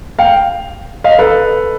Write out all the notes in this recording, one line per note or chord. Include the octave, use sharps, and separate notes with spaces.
F5 G5
D#5 F5
A4 B4